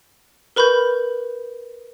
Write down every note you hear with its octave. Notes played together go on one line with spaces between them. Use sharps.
A#4 B4 B5 C#6 G6